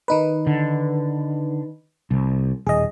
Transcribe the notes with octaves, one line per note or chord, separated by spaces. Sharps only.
D#3 D#4 B4
D3
C2
D#1 G#4 D#5